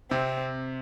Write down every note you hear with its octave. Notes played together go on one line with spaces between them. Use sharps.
C3 C4